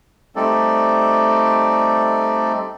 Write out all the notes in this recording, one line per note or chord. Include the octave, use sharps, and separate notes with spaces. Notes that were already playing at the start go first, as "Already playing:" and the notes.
G3 A3 C4 D#4 A4 D5